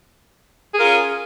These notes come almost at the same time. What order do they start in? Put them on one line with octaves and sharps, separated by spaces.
G#4 A#4 F4 C#4